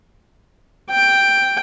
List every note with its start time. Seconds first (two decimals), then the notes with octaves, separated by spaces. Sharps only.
0.90 G5